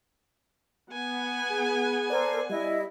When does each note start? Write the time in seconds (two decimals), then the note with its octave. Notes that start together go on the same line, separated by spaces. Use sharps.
0.93 B3 F#5 G#5
1.50 G#4
2.10 A4 A#4 C5 D5
2.49 G3 E4 D#5